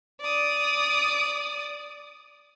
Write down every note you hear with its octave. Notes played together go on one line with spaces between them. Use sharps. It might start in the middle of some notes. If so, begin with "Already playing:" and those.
D5 D#6